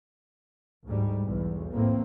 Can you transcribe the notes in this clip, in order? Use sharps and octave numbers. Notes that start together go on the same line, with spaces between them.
D2 G#2 G3
B1 E2
A2 A#3 C4